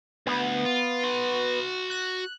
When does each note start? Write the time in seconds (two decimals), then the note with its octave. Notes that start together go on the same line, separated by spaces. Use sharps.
0.27 D2 B3
0.65 F4
1.04 F#4 C6
1.90 F#6